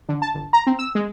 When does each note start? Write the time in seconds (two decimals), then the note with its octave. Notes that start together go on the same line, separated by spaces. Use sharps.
0.09 D3
0.22 A5
0.34 G1
0.53 A#5
0.67 C4
0.79 E6
0.95 G#3